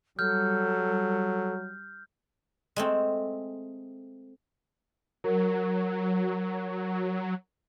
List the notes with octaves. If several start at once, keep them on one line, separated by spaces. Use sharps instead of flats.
F#3 G3 A4 F6 G6
G#3 A3 C4
F#3 A#4